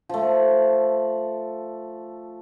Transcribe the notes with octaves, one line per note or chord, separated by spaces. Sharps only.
F3 A3